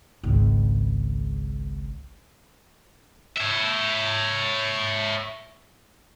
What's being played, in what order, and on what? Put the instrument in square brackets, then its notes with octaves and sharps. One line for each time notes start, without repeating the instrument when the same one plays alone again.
[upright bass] G#1 C#2
[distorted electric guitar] C#5 E5